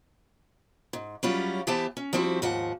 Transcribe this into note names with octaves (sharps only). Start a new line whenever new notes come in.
G#2
F#3 G3 C#4 E4 F4
E3 B3 G4 C5 E5 A5
C#4
F3 G3 C4 E4 F#4
D#2 G#2 F3 F#5